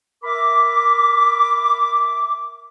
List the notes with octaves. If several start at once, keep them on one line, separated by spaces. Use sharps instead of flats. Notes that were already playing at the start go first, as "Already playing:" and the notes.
A#4 E5 B5 D6